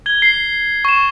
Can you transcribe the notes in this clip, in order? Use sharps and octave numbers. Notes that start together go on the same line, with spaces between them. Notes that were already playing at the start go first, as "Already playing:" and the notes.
G#6 G7
C7
C#6 E7